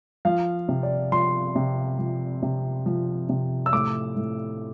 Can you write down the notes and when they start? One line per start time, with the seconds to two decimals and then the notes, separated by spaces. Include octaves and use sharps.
0.25 F3 F5
0.69 C3
0.83 D5
1.12 F3 C6
1.56 C3
1.99 F3
2.43 C3
2.86 F3
3.29 C3
3.66 E6
3.73 A2 D6
4.16 A2